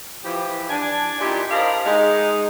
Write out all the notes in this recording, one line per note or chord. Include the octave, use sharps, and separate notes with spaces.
E3 F3 G4
D4 G#5
A#2 D#4 E4 G4
A#4 C5 D#5 F5 A5 B5
G#3 D#4